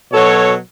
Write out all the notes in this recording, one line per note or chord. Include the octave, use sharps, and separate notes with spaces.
B2 F#3 A4 C#5